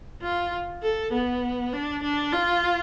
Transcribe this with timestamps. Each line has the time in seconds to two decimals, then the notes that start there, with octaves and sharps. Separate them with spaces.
0.22 F4
0.83 A4
1.13 B3
1.73 D4
2.03 D4
2.33 F4